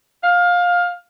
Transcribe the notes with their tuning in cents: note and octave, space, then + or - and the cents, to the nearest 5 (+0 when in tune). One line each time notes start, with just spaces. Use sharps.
F5 +20